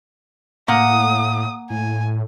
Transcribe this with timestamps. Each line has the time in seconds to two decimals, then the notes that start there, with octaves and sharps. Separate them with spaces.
0.68 A2 A#3 F#5 D#6
1.70 A2 G#5